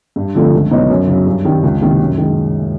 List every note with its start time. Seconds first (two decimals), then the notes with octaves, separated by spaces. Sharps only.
0.16 G2
0.35 D3 F3 A3 C4
0.53 C#2
0.71 B2 F#3 B3 D#4
0.90 F#2
1.08 C#3 F#3
1.26 G2
1.44 D#3 G3 C4
1.63 C#2
1.81 C3 D#3 G3 A#3
2.00 F#2
2.17 D#3 G#3